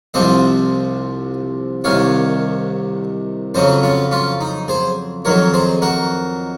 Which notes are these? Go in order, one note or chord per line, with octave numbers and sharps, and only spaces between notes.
C2 C3 F3 C4 C5 D#5
C2 C3 D#3 C#5 F5
F2 C#3 F#3 C#4 C5 D#5
C#4 F4
C#4 F4
D#4
G#4 C5
F2 D#3 F#3 A#4 C#5
G#4 C5
F#4 A#4